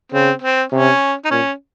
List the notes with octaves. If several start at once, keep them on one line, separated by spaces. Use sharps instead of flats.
C#3 C4
C4
C3 C#4
D#4
A#2 C#4